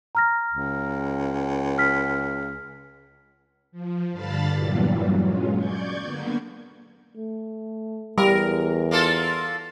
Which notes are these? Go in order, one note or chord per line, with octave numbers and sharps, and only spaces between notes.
A#5 F6 A#6
C#2
F6 B6
F3
G2 D3 F5 A5 B5 A6
E2 G2 A#2 E3 F#3 G3
F#3 G#3 C#4 F4
D5 C#6 G6 G#6
D3 A#3 B3
A3
E2 G3 A#4
A#3 F4 A4